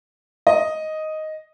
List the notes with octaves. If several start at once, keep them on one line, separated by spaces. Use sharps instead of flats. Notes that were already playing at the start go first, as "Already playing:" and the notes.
D#5